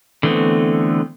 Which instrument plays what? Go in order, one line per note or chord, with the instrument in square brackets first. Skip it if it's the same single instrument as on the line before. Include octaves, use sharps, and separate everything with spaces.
[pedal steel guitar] D3 E3 A3 B3 C4